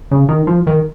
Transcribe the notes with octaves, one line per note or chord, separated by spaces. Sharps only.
C#3
D#3
F3
D#3